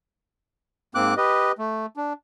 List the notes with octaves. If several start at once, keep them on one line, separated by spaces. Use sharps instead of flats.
G#2 A#3 C4 D6 F#6
G4 B4 D#5
A3
D4